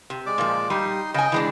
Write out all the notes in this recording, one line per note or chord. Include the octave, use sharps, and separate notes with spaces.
C3
G#3 D5 D6
A#2 F3
G3 D#4 C6 D#6
C#3 D#5 G5 G#5
E3 G#3 D4